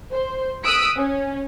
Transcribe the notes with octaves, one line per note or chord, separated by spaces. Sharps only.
C5
D#6 E6 F#6 B6 D7
C#4